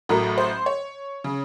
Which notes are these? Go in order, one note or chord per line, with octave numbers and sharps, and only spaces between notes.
A1 A2 F#3 A3 A#4
C5
C#5
C#3